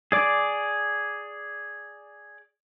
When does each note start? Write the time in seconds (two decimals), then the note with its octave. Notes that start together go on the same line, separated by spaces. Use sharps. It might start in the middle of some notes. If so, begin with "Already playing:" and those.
0.12 G#4 D5 D6